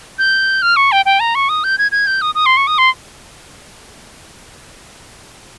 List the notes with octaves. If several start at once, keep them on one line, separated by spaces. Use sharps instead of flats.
G6
F6
C#6
G5
G5
A#5
C#6
D#6
G6
G#6
G#6
G6
D#6
D#6
C6
C#6
D#6
C6